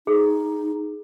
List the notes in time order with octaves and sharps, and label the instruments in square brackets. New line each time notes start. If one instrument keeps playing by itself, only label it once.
[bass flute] D#4 [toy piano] G#4 A4